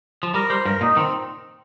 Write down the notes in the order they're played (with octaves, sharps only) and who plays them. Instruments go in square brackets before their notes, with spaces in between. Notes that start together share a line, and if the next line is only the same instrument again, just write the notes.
[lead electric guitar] F3
[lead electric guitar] G3 [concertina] A#4
[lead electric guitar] G3 [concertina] C5
[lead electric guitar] G2 [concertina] A#4
[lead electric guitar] A#2 [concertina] D#4
[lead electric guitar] D#3 [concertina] C4